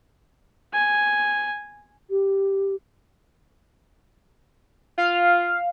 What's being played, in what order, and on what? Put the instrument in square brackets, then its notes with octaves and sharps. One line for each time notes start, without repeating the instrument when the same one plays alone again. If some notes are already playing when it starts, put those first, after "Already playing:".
[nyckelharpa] G#5
[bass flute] G4
[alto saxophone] F4 [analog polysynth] F5